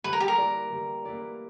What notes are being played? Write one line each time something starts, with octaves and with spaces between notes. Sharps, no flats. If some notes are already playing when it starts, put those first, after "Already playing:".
G3 B4
A#4
G4
A#4
A#3 E4 B4 D5
G3
A#3 E4 B4 D5